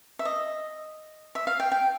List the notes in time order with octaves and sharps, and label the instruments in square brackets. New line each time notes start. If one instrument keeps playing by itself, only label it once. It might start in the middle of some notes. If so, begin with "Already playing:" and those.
[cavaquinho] E5
D#5
E5
F5
G5
G5